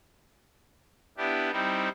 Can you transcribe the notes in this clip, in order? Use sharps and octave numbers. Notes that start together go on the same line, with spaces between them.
B3 D4 E4 G4
G3 C4 D#4 E4